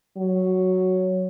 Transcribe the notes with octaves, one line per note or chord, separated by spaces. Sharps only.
F#3